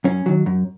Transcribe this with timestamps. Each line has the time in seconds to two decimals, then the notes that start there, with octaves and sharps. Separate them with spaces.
0.04 F#2 C#4
0.26 D#3 F#3
0.46 F#2